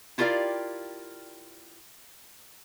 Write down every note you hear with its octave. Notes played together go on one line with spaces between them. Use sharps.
E4 F4 G4 A#4 D5 F5